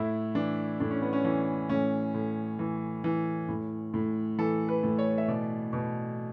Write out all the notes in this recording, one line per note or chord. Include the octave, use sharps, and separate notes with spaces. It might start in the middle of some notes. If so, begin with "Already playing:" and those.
Already playing: A2 E4
E3 D4
A2 D4
C#4
B3
C#4
E3 C#4
A2 C#4
A2
E3
E3
A2
A2
E3 A4
B4
A2
C#5
E5
B2 D5
B2